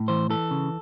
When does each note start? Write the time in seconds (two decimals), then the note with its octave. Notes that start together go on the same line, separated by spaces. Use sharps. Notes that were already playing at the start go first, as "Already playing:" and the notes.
Already playing: A2
0.08 E3 C5
0.30 E3 A4
0.51 C#3